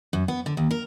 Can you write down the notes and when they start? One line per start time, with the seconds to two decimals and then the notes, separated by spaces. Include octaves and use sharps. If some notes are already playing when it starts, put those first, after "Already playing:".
0.13 F#2
0.28 B3
0.46 D3
0.57 D#2
0.71 A#4